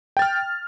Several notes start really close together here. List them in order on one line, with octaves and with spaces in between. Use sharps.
G5 A6 F6